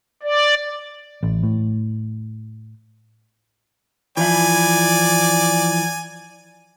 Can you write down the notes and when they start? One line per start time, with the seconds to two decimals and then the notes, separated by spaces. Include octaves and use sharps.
0.23 D5
1.23 A1
1.43 A2
4.17 E3 F3 E4 D5 G#5